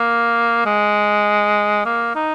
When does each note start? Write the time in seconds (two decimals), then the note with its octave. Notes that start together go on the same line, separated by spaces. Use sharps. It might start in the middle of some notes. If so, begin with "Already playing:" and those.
Already playing: A#3
0.66 G#3
1.85 A#3
2.15 D#4